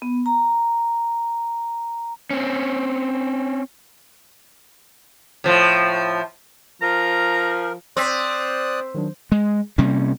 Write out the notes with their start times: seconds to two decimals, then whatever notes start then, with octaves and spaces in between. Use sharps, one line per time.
0.02 B3
0.26 A#5
2.31 C4 C#4
5.44 A2 F3
6.82 F3 A#4 A#5
7.97 C4 D5 C6 D#6 E6 F#6 B6
8.95 D#3 F#3 D4
9.32 G#3
9.78 C3 G3 A#3 C#4